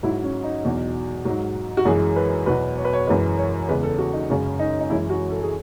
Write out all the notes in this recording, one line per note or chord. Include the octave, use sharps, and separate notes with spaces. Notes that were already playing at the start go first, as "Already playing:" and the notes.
G#2 F#3 E4
C#4
D#4
E2 B2 F#3
G#2 F#3
F#4
F#2 E3 G#3 G#4
B4
E2 B2 F#3 B4
C#5
B4
C#5
F#2 E3 G#3 B4
C#5
E2 C#3 G#3 B4
A4
F#4
D#4
F#2 C#3 G#3 C#4
D#4
D#4
F#2 E3 G#3 E4
F#4
A4
G#4